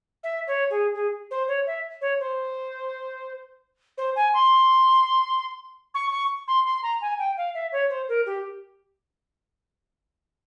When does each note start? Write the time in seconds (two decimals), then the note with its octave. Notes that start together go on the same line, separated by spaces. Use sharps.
0.23 E5
0.47 C#5
0.70 G#4
0.95 G#4
1.31 C5
1.48 C#5
1.67 E5
2.01 C#5
2.20 C5
3.98 C5
4.16 G#5
4.34 C6
5.94 C#6
6.11 C#6
6.48 C6
6.66 C6
6.83 A#5
7.01 G#5
7.19 G5
7.37 F5
7.54 E5
7.72 C#5
7.90 C5
8.09 A#4
8.26 G4